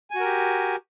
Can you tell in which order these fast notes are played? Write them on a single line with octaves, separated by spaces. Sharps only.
G#5 F#4 A#4 G4